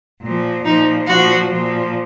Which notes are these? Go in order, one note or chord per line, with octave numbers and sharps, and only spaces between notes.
A#2
F3
A#2 F3 D#4
A#2 F3 F#4
A#2 F3